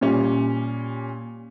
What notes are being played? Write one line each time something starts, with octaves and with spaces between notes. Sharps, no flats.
A#2 G3 C#4